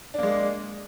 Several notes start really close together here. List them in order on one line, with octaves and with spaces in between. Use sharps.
D4 A#3 G#3